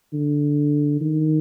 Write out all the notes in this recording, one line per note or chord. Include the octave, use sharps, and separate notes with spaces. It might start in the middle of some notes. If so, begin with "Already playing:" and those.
D3
D#3